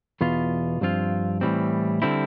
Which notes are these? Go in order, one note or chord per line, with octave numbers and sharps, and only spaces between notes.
E2 B2 B3 F4
G2 F3 C4 F4
A2 E3 G3 C4
D3 G3 C4 E4